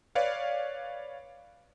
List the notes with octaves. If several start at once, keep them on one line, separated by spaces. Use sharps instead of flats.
B4 C#5 D5 F5